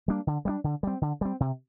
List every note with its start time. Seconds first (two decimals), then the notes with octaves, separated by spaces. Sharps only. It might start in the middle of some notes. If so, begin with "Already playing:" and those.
0.08 G3 A#3 D4
0.27 D3
0.45 G3 A#3 D4
0.64 D3
0.83 G3 C4
1.02 D3
1.21 G3 C4
1.40 C3